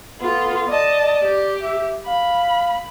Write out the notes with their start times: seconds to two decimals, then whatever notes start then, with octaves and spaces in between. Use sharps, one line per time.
0.21 B3 F4 A4
0.69 D5 D#5 A5
1.24 G4
1.62 E5
2.07 F5 B5